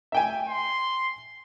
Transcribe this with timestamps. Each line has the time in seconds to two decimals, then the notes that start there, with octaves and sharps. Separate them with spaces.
0.12 E5 G5 G#5
0.48 C6